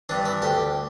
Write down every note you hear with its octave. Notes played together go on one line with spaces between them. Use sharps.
G2 E3 D4
E4
D2 G4